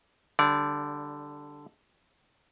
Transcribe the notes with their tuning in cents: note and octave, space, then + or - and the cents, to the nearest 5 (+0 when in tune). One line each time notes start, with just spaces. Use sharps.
D3 +0 G3 +0 D5 -25